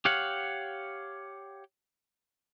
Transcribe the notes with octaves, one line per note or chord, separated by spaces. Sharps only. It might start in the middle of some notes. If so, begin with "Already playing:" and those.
G4 C#5 F5 F#5